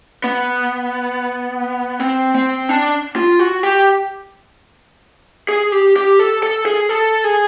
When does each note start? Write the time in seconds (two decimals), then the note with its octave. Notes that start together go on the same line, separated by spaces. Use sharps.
0.24 B3
2.00 C4
2.35 C4
2.69 D4
3.16 F4
3.39 F#4
3.63 G4
5.49 G#4
5.72 G4
5.96 G4
6.19 A4
6.43 A4
6.66 G#4
6.89 A4
7.24 G#4